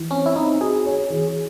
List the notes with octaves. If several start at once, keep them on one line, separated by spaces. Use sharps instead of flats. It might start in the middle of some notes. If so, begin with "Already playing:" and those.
Already playing: E3
C4 C#4
E4
C4 D#4
F#4 G#4
C#5
E3